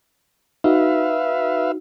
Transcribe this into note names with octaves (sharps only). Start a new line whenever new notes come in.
D#4 F#4 B4 E5 F5